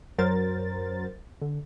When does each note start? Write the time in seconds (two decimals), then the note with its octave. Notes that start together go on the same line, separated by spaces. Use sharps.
0.18 F#2 F#3 A#4 C5 A6
1.41 D3